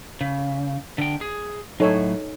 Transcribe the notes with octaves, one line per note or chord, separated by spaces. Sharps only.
C#3
D3 G5
G#4
A2 F#3 D#4 A4 C#5